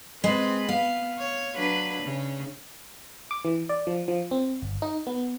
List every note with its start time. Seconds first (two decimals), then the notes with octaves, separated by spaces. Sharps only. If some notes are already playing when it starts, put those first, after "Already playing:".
0.24 G#3 C4 B4
0.69 B3 F5
1.18 C#5
1.55 F#3 D4 B4
2.03 C#3
3.31 D6
3.45 E3
3.69 D5
3.87 F3
4.08 F3
4.31 C4
4.62 G1
4.82 D#4
5.07 B3